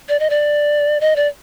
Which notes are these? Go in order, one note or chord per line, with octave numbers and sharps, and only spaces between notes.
D5
D#5
D5
D#5
D5